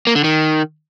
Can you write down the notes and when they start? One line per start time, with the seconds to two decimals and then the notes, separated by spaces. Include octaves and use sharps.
0.07 A#3
0.15 D3
0.24 D#3